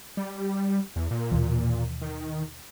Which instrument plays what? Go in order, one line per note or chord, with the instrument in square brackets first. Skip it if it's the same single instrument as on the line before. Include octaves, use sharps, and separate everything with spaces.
[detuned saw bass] G3
E2
A#2
[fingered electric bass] D#2 B2 E3
[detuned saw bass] D#3